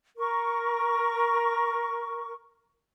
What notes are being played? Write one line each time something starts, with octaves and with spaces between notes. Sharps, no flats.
A#4 C#6